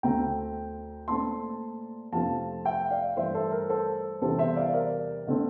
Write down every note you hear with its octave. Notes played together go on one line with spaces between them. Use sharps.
D2 D3 A3 C4 G5 A#5
A#2 A3 C4 A5 C6
F2 C3 F3 A3 C4 F5 A5
E5 G5
D5 F5
G2 E3 A3 C5 E5
A4 C5
A#4
A4 C5
E2 C3 E3 G3 C4 A4 C5
C5 E5
D5 F5
A#4 D5
D3 A3 C4